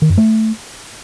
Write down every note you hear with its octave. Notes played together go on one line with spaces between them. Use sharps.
D#3
F#2
A3